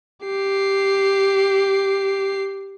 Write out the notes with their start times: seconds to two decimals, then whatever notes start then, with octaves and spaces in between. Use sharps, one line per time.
0.25 G4 C7